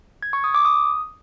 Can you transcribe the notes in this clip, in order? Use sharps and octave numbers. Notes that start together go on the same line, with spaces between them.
G#6
C#6
D#6
D6
D#6